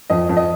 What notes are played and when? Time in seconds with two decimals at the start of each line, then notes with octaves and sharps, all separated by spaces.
0.10 F2 D#5
0.29 F2
0.37 D#5